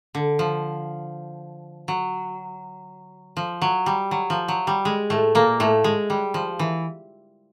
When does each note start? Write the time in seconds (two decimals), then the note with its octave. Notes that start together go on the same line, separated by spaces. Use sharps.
0.15 D3
0.39 F3
1.88 F#3
3.37 F3
3.62 F#3
3.86 G3
4.11 F#3
4.30 F3
4.48 F#3
4.67 G3
4.85 G#3
5.10 A2 A3
5.35 A#2 A#3
5.60 A2 A3
5.84 G#3
6.10 G3
6.34 F3
6.59 E3